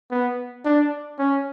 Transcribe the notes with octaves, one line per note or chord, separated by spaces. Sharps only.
B3
D4
C#4